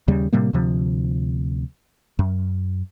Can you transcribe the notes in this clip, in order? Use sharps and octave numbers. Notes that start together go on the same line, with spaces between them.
D#2 C#3 G3
A2 C3 G3 A#3
D2 C3 F3
F#2